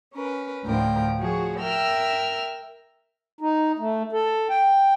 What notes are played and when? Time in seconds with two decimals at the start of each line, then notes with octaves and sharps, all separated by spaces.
0.13 C#4 A#4 B4
0.64 D2 A2 D3 F3 A#4 G5
1.19 F3 F#4 G#4 C#5
1.59 A#4 E5 G5 E6 F6
3.41 D#4
3.79 A3
4.12 A4
4.50 G5